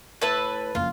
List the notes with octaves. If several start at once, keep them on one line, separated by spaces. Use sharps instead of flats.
A2 B4 E5 A5
F#1 F2 F4